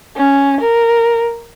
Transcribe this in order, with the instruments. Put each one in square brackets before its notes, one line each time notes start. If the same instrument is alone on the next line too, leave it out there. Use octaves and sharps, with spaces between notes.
[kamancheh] C#4
A#4